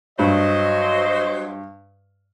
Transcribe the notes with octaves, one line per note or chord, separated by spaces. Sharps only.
G2 F#3 C5 D#5